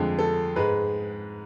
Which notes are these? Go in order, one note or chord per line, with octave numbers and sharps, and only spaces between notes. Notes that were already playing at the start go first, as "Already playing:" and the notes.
Already playing: F2 D3 G#3
A4
G#2 G#3 B4